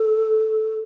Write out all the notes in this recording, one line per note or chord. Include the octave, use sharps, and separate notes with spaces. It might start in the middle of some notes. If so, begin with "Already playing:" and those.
Already playing: A4